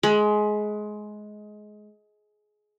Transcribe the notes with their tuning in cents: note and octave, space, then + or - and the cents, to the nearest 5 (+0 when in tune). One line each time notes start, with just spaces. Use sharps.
G#3 +20 B5 +0